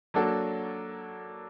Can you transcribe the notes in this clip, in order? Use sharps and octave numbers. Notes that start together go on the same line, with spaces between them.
F#3 A#3 D4 F#4 A4